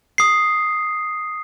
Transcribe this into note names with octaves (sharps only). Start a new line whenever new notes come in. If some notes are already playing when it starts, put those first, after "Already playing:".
D#6 C7